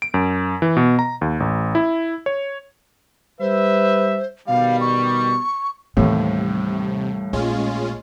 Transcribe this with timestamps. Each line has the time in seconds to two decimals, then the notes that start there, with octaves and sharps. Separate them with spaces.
0.02 D7
0.14 F#2
0.62 E3
0.77 B2
0.99 A#5
1.21 D#2
1.40 A1
1.75 E4
2.26 C#5
3.40 G3 B4 C5 E5
4.47 B2 D#3 G3 F5
4.81 C#6
5.97 D#2 A2 C3 E3 G3
7.33 A#1 G#3 C#4 F4